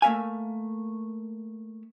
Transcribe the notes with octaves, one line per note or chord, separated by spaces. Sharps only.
A3 A#3 E5 F5 G#5